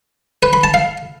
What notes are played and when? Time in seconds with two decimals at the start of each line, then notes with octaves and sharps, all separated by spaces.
0.43 B4
0.53 B5
0.64 A5
0.74 F5